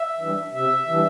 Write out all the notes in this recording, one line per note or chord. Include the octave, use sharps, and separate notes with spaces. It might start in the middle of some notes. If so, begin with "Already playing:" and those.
Already playing: E5
E3 G3 D4
C3 E5
E3 G3 D4